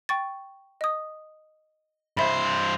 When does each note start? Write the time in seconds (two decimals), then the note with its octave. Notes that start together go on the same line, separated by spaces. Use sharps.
0.09 G5 C#6 A6
0.81 D#5 D#6
2.17 G2 C5 E5 B5